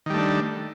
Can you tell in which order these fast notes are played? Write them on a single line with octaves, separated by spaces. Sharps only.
D#3 G3 A3 D4